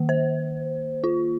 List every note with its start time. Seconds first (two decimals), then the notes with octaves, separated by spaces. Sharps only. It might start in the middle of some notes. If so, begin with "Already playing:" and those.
Already playing: D#3 A#3
0.09 C5
1.04 F4